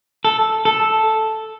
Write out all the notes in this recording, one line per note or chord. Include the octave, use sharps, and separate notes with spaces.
A4
A4